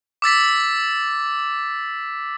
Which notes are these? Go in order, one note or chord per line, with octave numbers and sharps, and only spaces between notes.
D6 E6 A6 B6